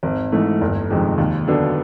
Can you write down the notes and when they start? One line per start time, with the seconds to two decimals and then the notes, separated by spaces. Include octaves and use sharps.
0.03 G#1
0.32 G#2 E3 A3
0.61 G1
0.90 F2 C3 D#3 G#3
1.18 D#2
1.47 D3 F#3 B3 D4